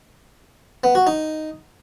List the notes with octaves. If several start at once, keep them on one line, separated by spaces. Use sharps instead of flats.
B3
F#4
D#4